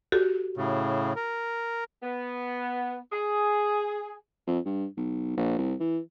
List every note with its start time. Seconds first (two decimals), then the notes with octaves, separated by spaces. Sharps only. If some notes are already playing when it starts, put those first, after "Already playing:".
0.12 F#4 G4 A4
0.57 A2 C#3
1.16 A#4
2.03 B3
3.11 G#4
4.47 F2
4.65 G2
4.97 B1
5.37 A#1
5.58 C2
5.80 E3